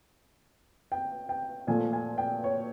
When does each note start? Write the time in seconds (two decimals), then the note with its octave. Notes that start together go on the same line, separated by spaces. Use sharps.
0.92 G5
1.29 G5
1.67 A#2 F3 A3 G#5
1.93 G#5
2.18 G5
2.44 C#5